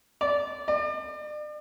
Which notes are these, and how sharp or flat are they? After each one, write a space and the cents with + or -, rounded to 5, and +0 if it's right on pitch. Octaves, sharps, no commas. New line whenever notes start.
D5 -15
D5 +40